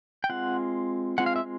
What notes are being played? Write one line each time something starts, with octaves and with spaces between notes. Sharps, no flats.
G5
G#3 C4 F4 F#5
G#3 C4 F4 F#5
F5
E5